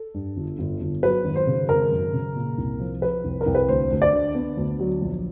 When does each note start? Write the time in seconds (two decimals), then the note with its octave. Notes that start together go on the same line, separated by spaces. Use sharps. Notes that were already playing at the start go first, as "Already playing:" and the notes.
Already playing: A4
0.14 G2
0.37 G1
0.59 G1
0.81 G1
1.03 F#3 B4
1.24 G#1
1.36 C5
1.47 C#3
1.69 G#1 A#4
1.91 F#2
2.13 C#3
2.36 A#2
2.58 C2
2.80 F3
3.02 F3 B4
3.24 C2
3.41 A#4
3.46 C2
3.55 B4
3.68 D2 C5
3.91 D2
4.02 D5
4.13 D3
4.35 B3
4.57 D2
4.79 F#3
5.01 A#1